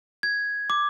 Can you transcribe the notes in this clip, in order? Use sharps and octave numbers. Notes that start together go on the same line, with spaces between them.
G#6
D6